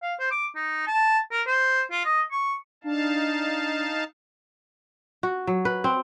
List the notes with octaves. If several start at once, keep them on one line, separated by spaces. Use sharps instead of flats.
F5
C5
D6
D#4
A5
A#4
C5
F4
D#5
C#6
D4 D#4 F5 A5
F#4
F#3
B4
C4